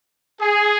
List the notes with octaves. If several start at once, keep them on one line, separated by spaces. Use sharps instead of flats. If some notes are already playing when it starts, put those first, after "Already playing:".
G#4